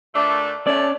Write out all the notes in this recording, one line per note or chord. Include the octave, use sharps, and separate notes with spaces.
A#2 A3 D4
A3 C#4 D5